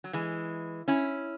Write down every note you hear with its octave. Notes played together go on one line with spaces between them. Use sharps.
F#3
E3 G#3
C#4 E4